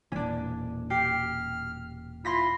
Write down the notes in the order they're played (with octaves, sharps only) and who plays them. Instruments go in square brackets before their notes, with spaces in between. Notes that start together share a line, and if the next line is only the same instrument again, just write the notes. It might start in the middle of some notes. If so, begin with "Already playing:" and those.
[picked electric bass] E1 A#2 E3 [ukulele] C#4 D4
[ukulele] G4 [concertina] F6 [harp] C7
[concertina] E4 F4 [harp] C6 A#6 B6